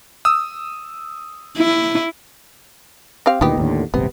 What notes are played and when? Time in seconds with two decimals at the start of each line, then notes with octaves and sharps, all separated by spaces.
0.25 D#6 E6
1.57 E4
3.26 C4 G4 F5
3.41 D2 A#2 D#3 B3 D#4 G4
3.57 D#2 A2 D3
3.94 D#1 G#1 C3 B3